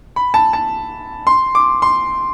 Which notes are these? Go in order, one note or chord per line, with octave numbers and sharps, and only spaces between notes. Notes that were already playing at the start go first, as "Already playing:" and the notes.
B5
A5
A5
C6
D6
C6